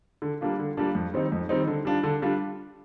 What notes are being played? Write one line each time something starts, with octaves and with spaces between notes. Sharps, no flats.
D3
G3 A#3 D4 F4
D3
G3 A#3 D4 F4
F2
D#3 G3 C4 D#4
F2
D#3 G3 C4 D#4
D3
G3 D4 F4
D3
G3 D4 F4